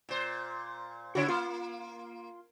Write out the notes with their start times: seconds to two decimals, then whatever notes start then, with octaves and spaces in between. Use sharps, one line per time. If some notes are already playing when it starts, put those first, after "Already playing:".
0.09 A#2 C5
1.15 C#3 E4 F#4 C#5
1.28 A#3 F4 C6